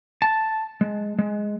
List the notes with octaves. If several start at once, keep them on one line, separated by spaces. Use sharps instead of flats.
A5
G#3
G#3